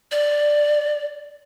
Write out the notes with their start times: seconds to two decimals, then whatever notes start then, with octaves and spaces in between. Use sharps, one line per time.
0.12 D5